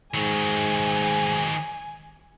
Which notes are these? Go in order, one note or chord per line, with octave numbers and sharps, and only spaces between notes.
G#2 D#3 F#3 G#5